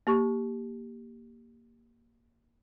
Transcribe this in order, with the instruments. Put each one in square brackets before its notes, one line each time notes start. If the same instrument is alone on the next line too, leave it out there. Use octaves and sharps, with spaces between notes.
[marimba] A#3 G4 C#6